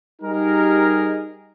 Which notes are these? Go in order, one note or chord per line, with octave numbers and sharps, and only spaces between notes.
G3 D#4 G4 G#4 A#4